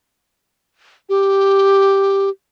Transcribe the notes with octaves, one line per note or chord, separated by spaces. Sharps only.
G4